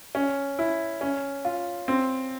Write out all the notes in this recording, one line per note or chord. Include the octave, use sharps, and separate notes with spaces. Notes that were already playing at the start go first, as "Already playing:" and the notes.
C#4
E4
C#4
F4
C4